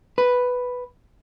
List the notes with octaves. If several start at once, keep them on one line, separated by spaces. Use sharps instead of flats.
B4